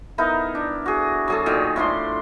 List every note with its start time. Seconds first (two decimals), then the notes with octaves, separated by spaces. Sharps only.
0.18 B3 D#4 E4 A#4
0.55 D4
0.86 F#4 G#4
1.28 F#3 G#4 A4
1.46 A#2 D#3
1.76 A2 F3 D4 C6